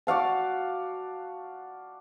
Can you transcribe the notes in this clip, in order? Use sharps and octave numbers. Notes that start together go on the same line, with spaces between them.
F#4 D5 F5 A5